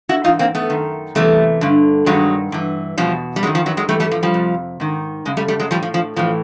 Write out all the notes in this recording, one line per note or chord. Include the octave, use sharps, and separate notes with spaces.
E4 F#4
G#2 E3 D#4 F4
A#3 C4
A3 B3
F#2 D#3
E2 C3 E3 G3 A3
G2 D3
G2 D#3 F#3 G#3
G2 E3
E2 B2 F3 G3
G3
F#2 D#3 F#3 G#3
F3
E3 F#3
F#3 G#3
G#2 E3 G3 A3
G3 A3
F3
F3 G3
F2 C3
G#2 D#3
F#2 C#3 G#3
G3 A3
G3 A3
F#3 G#3
A2 E3 F3 G3
F3
F3
A2 E3 F3